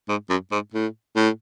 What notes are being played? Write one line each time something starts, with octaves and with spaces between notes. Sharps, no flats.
G#2
F#2
G#2
A2
A2